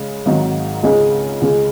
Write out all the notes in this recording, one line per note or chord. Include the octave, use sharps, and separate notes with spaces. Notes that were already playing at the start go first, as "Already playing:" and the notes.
Already playing: C#3 G#3
G#1 G#2 D#3 F#3
C#2 C#3 G#3 D#4 G#4
C#2 C#3 G#3